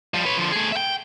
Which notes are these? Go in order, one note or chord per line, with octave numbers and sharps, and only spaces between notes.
F3 G3
B4 C#5
D3 F3
A3 G#4
E5 G5